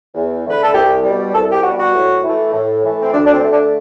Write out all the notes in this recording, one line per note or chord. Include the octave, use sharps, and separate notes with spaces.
E2
D3 A3
B4
A4
C2 G4
B2 G3
C2 A4
G4
B2 G3 F#4
F#4
A2
E3 A3
A2
E3 A3
C4
D2 D4
D4
C4
D3 A3
D4